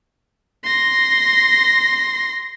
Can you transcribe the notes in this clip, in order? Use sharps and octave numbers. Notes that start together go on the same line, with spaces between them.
C6 A#6